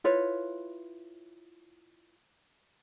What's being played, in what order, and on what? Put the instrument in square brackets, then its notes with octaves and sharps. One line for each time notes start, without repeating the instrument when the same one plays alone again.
[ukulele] E4 F4 B4 C#5